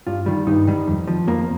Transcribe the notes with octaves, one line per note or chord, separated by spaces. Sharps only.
G2 F4
D#3 G3
G2 D#4
D#3 G3
F2
F3
F2 A#3